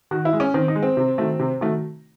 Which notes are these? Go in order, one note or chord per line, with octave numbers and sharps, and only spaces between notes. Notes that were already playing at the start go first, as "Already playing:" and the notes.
D#3 F#4
E4
G#3
C#4
D#3 C4
D#4
G#3
C4
C3
D#3 F#3 A3
C3
D#3 F#3 A3